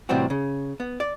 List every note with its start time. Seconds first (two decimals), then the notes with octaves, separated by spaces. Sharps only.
0.09 A2 C3 E3 G3 C4 F#4
0.30 C#3
0.80 B3
1.00 D5